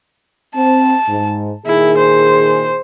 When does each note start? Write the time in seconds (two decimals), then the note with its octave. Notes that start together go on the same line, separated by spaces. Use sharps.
0.55 C4 A5
1.08 G#2
1.66 A#2 D#3 E4 G#4
1.97 C5